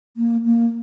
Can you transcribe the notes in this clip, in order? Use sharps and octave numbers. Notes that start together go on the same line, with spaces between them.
A#3
A#3